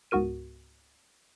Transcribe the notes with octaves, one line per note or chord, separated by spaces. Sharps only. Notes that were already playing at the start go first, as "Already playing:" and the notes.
C#2 G#2 B3 F#4 A#4 D#7